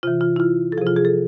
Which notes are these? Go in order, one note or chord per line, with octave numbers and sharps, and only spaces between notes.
C3 E3 F4
F4
E4
F4
A4
C3 F3 G#4
F4
G#4
A4